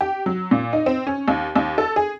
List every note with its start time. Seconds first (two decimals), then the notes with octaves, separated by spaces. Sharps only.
0.01 G4
0.26 F#3
0.51 A#2
0.73 D#4
0.86 C4
1.07 C#4
1.28 D#2
1.56 D#2
1.78 A4
1.96 G#4